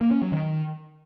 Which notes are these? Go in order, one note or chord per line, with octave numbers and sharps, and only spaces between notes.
A#3
C#4
F#3
D#3